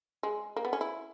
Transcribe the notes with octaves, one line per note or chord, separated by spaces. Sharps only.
G#3
A#3
B3
C#4
E4